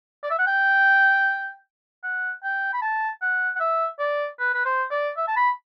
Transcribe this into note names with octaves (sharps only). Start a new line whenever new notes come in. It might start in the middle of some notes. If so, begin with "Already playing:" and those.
D5
E5
F#5
G5
F#5
G5
B5
A5
F#5
F#5
E5
D5
B4
B4
C5
D5
E5
A5
B5